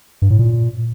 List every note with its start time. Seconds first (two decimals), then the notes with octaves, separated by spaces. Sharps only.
0.22 G2
0.30 A2
0.39 A#2